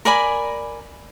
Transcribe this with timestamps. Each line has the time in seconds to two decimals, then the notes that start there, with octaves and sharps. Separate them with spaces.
0.05 A#4 D5 G#5 B5